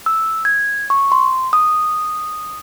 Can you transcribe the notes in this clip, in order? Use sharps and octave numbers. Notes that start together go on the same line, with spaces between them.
E6
G#6
C#6
C6
D#6